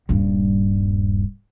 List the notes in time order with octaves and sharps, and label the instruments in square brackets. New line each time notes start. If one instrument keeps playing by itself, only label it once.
[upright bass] D#1 G2